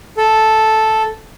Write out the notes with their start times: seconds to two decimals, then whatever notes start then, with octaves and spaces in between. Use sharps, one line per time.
0.17 A4